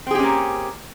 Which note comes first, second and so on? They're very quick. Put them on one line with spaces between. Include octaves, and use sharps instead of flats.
C4 G#4 G4 C#4 A#3